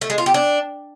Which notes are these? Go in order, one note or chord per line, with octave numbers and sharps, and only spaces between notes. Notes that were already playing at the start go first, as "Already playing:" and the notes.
A3
G#3
F4
G4
D4